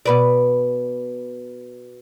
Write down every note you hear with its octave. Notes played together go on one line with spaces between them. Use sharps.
B2 B4 D5